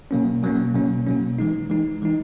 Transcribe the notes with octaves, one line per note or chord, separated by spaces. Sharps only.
B2 F#3 A#3 C#4
B2 F#3 A#3 C#4
B2 F#3 A#3 C#4
B2 F#3 A#3 C#4
E3 G#3 D#4
E3 G#3 D#4
E3 G#3 D#4